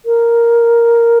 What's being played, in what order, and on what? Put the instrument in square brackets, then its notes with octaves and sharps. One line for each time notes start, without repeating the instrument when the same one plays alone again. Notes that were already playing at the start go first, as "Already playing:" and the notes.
[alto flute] A#4